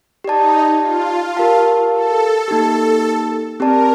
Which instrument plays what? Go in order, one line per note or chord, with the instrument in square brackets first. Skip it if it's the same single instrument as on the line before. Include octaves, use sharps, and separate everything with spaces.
[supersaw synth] D#4 [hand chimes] G4 D5 A5
[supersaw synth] F4
[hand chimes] G4 A#4 F5 A5
[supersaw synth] A4
[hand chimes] A#3 D#4 G4
[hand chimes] C4 G4 D5 A5 [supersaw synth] A#4